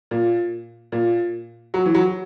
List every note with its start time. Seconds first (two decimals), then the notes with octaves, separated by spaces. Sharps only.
0.11 A#2
0.92 A#2
1.74 F#3
1.86 E3
1.95 F#3